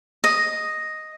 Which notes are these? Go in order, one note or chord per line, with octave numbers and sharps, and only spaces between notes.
D#5